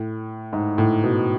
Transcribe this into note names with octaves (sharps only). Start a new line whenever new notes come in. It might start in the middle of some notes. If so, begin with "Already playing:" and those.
Already playing: A2
G#2
A2
B2